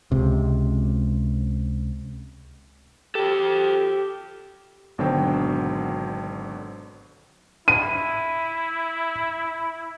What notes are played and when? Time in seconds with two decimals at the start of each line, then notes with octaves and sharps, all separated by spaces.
0.12 C#2 C3
3.15 G4 A4 C5
4.98 G#1 B2 D3 F#3 C5 G5
7.68 E4 D#7